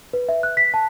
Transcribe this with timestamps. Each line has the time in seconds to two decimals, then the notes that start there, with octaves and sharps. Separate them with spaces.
0.13 B4
0.29 E5
0.43 F#6
0.57 B6
0.74 A5